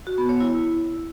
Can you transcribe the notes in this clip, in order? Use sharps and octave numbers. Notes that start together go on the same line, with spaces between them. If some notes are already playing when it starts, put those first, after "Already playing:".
F#4
B3
C#5
E4